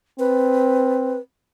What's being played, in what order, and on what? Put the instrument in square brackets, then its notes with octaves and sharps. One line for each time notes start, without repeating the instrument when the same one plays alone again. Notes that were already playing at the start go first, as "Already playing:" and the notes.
[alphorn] C4 [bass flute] B4